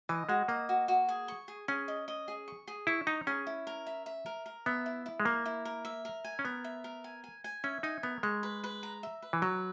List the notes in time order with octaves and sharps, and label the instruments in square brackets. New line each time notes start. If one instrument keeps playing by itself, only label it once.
[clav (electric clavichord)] E3 [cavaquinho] D#5
[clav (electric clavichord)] G#3 [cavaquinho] F#4
[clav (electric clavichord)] A#3 [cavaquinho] D#5
[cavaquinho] F#4
F#4
G#4
C#6
G#4
[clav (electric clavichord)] C#4 [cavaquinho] G#4
[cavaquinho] D#5
D#5
G#4
C#6
G#4
[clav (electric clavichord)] E4 [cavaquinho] C#6
[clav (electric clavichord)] D#4 [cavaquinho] A#5
[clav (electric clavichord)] C#4 [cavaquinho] G#4
[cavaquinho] E4
A#4
E5
E5
A#4
A#4
[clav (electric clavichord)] B3 [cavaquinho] E5
[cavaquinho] E4
E4
[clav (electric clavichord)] G#3
[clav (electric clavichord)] A#3 [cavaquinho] A#4
[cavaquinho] E4
A#4
E5
A#4
G#5
[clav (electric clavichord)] C#4
[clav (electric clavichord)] B3 [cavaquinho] A#4
[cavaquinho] E5
A#4
G#5
G#5
G#5
[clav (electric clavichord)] C#4 [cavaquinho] E5
[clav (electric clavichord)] D#4 [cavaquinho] G#5
[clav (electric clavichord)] B3 [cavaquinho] A#4
[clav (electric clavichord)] G#3 [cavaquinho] C#6
[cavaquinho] B4
B4
A#5
E5
B4
[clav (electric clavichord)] E3
[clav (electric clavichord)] F#3 [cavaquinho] B4